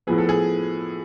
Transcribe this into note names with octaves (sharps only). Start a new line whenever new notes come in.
A2 F3 B3 G#4
A4
G#4